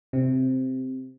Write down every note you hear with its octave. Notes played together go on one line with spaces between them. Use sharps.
C3